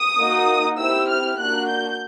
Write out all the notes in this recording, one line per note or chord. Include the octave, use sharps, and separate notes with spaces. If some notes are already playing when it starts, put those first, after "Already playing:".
Already playing: D#6
A#3 D#4 F#4
C4 E4 G4 E6
F6
A#3 D4 F#4 F#6
G6